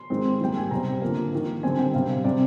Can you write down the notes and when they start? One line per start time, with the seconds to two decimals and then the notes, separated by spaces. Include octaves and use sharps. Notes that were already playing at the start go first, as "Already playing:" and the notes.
Already playing: C6
0.10 D#3 G#3 C4
0.41 D#3 G3 A#3 G5
0.57 G#5
0.71 C3 G3 C4 A#5
1.02 D3 F3 A#3
1.33 D#3 A#3
1.63 D3 G3 C4 G#5
1.79 G5
1.94 C3 G3 C4 F5
2.24 C3 G3 C4 D5